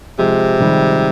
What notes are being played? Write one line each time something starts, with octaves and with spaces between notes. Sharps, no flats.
C3 F3 G#3
D#3 G3